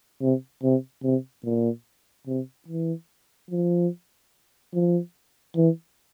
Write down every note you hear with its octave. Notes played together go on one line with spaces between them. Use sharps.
C3
C3
C3
A#2
C3
E3
F3
F3
E3